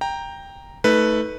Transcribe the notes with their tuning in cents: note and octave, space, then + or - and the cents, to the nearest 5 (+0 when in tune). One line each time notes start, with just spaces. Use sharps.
G5 +10 A#5 +0
A3 +0 D#4 +30 B4 +0